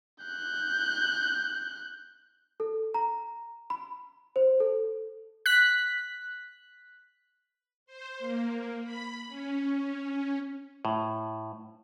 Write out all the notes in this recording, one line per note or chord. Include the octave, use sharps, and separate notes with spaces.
F#6 G6
A4
A#5
B5
C5
A4
F#6 B6
C5
A#3
B5
C#4
A2